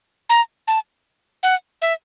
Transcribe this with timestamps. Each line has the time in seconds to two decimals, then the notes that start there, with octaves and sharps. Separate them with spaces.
0.29 A#5
0.68 A5
1.43 F#5
1.82 E5